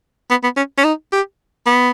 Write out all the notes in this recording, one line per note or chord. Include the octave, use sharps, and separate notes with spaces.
B3
B3
C#4
C#4
D#4
G4
B3